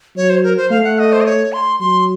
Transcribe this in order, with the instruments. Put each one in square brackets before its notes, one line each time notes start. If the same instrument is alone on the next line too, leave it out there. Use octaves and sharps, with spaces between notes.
[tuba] F#3 [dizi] C#5
[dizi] C5
A#4
C5
[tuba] A3 [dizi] F5
[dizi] F#5
D#5
C5
D#5
C#5
C6
[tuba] F#3 [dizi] C6